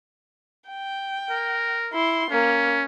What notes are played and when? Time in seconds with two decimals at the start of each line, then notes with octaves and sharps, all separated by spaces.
0.69 G5
1.30 A#4
1.93 E4 C6
2.31 A#3 C#4